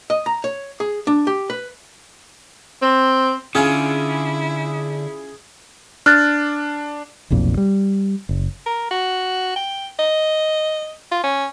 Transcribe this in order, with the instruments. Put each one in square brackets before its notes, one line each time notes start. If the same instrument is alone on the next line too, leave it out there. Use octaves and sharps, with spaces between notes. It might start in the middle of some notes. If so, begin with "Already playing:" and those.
[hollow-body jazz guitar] D#5
A#5
C#5
G#4
D4
G4
B4
[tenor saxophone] C4
[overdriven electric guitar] D3 [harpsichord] C#4 F4 [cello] E4 [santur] G#4
[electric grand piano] D4 [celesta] F6 F#6 A6
[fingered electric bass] F1 B1 F2 A#2
G3
F#1
[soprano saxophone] A#4
F#4
G5
D#5
F4
C#4